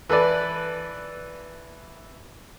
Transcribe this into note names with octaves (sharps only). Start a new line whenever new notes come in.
E3 A4 B4 D5